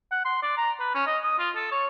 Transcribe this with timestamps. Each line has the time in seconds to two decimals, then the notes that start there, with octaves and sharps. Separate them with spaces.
0.12 F#5
0.25 C6
0.43 D5
0.58 A#5
0.80 B4
0.95 C#4
1.07 D#5
1.24 D#6
1.39 F4
1.55 A4
1.72 C#5